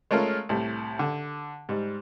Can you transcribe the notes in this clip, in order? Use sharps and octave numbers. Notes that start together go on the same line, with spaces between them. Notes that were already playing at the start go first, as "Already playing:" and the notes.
G#3 A3 C#4 F4 A#4
C2 A2
D3
G#2 G3